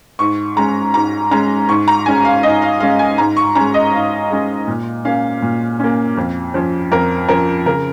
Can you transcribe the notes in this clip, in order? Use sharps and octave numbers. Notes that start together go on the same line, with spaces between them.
G#2 C#6
G#3 C#4 A#5
G#2 A#5
G#3 C#4 A#5
G#2 C#6
A#5
G#3 C#4 G#5
F5
G#2 D#5
F5
G#3 C#4 F5
G#5
G#2 A#5
C#6
G#3 C#4 A#5
D#5
G#2 F5
G#3 C#4
A#2
A#3 C#4 F5
A#2
A#3 C#4
F2
F3 C#4
F2 A#4
F3 C#4 A#4
C#3 A#4